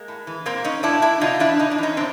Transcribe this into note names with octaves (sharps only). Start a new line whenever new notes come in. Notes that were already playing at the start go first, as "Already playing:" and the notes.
Already playing: G#3 A#3
A2
E3
A#2 A#3 C4
C#4 D#4
A#2 D4 E4
D4 E4
C3 D#4 F4
E3 D4 E4
C3 D#4
D4
E3 C#4 D#4
A#2 C4 D4